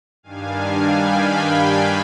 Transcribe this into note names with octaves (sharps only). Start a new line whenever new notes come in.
G2 D#3 G3 D4 F5 G#5
F5 G#5
G5 B5
G5 B5